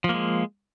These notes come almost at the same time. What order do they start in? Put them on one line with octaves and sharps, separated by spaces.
F3 A#3 G#3